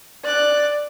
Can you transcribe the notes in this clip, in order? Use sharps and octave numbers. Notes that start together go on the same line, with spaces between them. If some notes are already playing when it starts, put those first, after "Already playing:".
D5 F#6